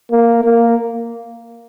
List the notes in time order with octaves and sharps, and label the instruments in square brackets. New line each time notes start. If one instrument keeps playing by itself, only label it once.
[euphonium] A#3
A#3